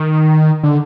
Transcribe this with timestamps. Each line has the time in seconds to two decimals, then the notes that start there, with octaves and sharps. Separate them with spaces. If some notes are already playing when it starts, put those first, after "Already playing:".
Already playing: D#3
0.63 D3